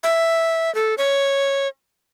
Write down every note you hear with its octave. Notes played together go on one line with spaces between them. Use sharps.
E5
A4
C#5